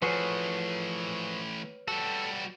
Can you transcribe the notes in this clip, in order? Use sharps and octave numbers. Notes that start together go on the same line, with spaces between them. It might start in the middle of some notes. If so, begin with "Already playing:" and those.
E3 F3 A3 F#4 G#4 B4 C#5
G3 F#4 A4